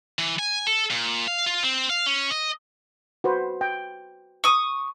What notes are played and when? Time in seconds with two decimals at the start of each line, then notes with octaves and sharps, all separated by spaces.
0.19 E3
0.39 G#5
0.67 A4
0.91 A#2
1.28 F5
1.46 F4
1.63 C4
1.90 F5
2.06 C#4
2.31 D#5
3.24 F#4 B4 C5
3.61 G5
4.44 C#6 D#6